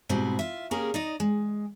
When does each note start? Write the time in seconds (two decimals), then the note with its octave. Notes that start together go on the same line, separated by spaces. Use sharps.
0.09 G#2 B2 G3 C4 E4
0.39 F4 E5
0.71 C#3 A#3 C#4 G4 G#4 A#4
0.94 D#4 D5 D#5
1.20 G#3